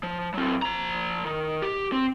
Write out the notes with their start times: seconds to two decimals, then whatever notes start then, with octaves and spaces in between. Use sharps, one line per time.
0.03 F3
0.34 F#3 C4
0.62 F3 A#5
1.25 D#3
1.62 G4
1.92 C4